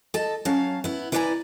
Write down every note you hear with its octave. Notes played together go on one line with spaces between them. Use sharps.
A4 D#5 A5
F#3 C#4 F5 A5
B3 E4
E4 B4 D5 F5 G#5 A#5